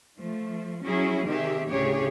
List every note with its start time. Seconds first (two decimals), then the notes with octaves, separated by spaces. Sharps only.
0.17 F3 A3
0.83 F#3 C#4 E4 G#4
1.27 C3 D#3 G4 G#4 E5
1.69 D2 A2 C#3 G4 G#4 C#5